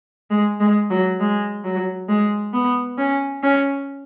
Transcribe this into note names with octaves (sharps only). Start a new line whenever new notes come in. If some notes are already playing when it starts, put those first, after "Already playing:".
G#3
G#3
F#3
G#3
F#3
G#3
B3
C#4
C#4